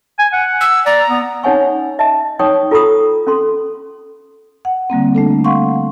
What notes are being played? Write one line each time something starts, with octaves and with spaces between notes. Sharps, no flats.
G#5
F#5
E6
D5 A#5
B3
C#4 D#4 C#5 F#5 G#5 C#6
D#5 E5 A5
D#4 C#5 G5 C#6 D#6
F4 A4 A#5 B5 C#6 D#6
C#4 A4 C6
F#5
D3 G3 A#3 C4
A3 D4 A4
F5 F#5 C6 C#6